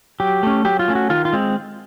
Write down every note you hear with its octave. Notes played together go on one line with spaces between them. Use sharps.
F#3 G4
A3 C#4
F#3 G4
F4
A3 C#4
F#4
D#3 F4
F4
G#3 C4